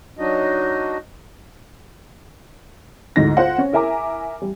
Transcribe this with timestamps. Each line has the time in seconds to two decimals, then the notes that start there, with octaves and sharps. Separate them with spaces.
0.19 F#3 D4 D#4 F#4 D#5
3.16 D2 G#2 D#4 E4 A#6
3.37 F4 C5 F#5
3.58 C#4 C#5
3.73 E4 A#4 E5 G#5 A#5 D6
4.42 G3